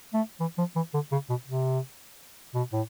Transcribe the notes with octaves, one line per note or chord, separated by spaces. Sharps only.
A3
E3
F3
E3
D3
C#3
B2
C3
B2
A2